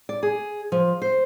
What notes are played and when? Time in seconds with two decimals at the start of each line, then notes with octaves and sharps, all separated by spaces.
0.09 D5
0.23 G#4
0.72 F3
1.02 C5